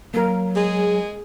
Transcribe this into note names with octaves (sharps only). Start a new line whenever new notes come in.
F#3 A#3 A#4
G#3 G#4